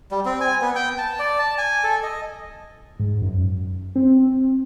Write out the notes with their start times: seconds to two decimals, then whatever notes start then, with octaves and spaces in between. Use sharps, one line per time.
0.11 G3
0.25 C4
0.41 G#5
0.61 B3
0.76 G5
0.98 A5
1.19 D5
1.39 A5
1.58 G#5
1.84 A4
2.03 D#5
2.99 G#2
3.22 F#2
3.96 C4